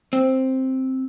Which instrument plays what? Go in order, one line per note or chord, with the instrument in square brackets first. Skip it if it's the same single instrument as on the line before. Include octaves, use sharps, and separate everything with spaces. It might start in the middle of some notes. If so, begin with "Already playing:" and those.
[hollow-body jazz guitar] C4